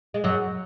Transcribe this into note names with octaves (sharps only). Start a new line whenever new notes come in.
G#3
F#2 F#3